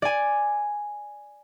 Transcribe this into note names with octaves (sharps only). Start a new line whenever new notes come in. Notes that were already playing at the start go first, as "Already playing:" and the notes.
D5 G#5